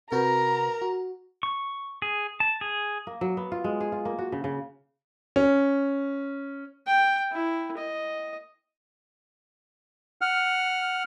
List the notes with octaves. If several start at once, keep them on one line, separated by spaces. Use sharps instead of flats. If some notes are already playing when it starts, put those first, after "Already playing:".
C3 F#4 A#4 B4 A#5
F#4
C#6
G#4
A5
G#4
A#3
F#3
B3
F4
G#3
G#4
F4
A#3
F#4
C#3
C#3
C#4
G5
E4
D#5
F#5 F6